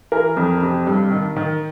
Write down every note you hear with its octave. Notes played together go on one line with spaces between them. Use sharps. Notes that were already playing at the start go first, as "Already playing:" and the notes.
E3 A#4
F2
C3
G2
D#3
D#3